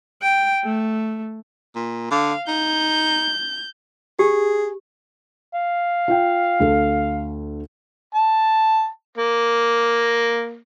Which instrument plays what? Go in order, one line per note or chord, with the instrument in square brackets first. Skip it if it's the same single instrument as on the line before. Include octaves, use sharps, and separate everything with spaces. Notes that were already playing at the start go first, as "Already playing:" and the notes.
[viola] G5
A3
[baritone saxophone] A#2
[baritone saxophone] D3 [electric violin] F5
[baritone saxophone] D#4 [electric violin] G6
[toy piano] G4 [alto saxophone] G#4
[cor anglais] F5
[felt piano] F4 G5
D2 A4
[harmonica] A5
A#3